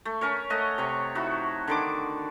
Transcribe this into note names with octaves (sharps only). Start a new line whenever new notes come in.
A3
C#4 A#4 C#5
A3 D#5 F#5 A#5
C3 C#5
D#4 E4 F#4
D3 D#3 D6